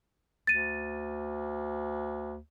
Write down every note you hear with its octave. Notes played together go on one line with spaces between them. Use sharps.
D2 A6 D#7